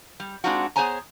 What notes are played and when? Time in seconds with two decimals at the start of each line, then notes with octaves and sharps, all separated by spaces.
0.20 G3
0.44 G#3 C4 D4 D#4 F4 F#4
0.76 B3 G#4 C5 C#5 G#5 A#5